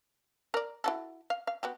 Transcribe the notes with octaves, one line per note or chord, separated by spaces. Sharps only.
A#4 D5
E4 F#4 A4
F5
F5
B3 F#4 G4